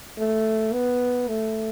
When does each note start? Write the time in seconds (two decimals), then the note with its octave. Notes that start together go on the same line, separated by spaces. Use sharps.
0.18 A3
0.73 B3
1.28 A3